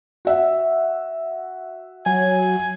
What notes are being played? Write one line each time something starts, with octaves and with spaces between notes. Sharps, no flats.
F#4 E5 F#5
F#3 G#5